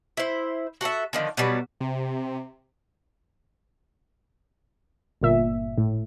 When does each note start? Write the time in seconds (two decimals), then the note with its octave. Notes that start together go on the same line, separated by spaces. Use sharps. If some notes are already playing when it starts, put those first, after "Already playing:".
0.17 E4 C5
0.81 F#4 A4 D5 E5
1.13 D3 D#3 F3
1.37 B2 F#3 G3 B3
1.80 C3
5.21 G1 A#2 E5
5.78 A2